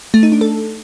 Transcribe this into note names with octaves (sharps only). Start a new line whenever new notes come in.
A3
D#4
D4
A4